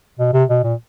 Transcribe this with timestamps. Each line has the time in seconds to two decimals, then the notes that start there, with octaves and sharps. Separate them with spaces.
0.19 B2
0.34 C3
0.49 B2
0.64 A#2